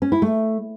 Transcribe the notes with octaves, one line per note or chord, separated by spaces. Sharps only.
C#4
E4
A3